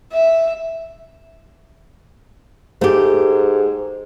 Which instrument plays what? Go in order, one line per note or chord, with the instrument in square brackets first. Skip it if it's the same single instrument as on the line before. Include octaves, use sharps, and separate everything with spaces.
[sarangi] E5
[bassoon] G#2 [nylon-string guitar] A3 G4